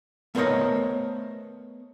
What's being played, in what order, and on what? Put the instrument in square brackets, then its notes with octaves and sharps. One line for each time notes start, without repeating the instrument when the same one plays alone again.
[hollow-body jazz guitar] A3 B3 A#4 C5 C#5 D#5